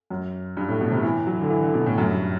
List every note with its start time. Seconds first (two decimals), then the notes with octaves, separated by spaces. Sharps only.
0.10 F#2
0.57 G2
0.68 A2
0.81 B2
0.92 C3
1.03 E3
1.27 F#3
1.41 D3
1.50 E3
1.63 D3
1.74 B2
1.86 A2
1.98 F#2
2.09 G2